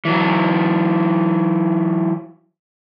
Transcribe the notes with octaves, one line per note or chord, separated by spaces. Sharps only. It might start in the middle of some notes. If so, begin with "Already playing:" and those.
E3 F#3